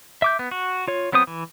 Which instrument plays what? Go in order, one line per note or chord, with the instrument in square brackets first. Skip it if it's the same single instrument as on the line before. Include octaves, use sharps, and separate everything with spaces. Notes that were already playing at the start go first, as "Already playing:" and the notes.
[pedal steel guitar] E5 D6 G6
B3
F#4
F4 C#5
F#3 B3 C4 C5 D#6
E3